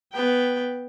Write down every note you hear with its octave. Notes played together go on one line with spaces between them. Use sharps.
B3 G5